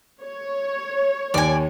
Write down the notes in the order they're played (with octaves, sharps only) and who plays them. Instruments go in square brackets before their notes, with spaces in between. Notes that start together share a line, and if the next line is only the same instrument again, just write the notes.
[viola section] C#5
[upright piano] D#2 [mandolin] D5 G#5